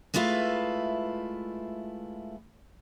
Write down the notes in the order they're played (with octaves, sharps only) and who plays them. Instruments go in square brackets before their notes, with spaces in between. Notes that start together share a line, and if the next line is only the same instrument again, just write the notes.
[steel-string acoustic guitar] G#3 A3 E4 F4 B4